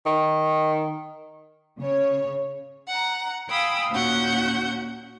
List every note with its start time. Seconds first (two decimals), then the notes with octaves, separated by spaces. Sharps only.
0.06 D#3
1.79 C#3 C#5
2.87 F#5 A#5
3.49 F5 G5 G#5 B5 D#6 E6
3.90 D#2 A#2 C#4 F#4 F#5 G6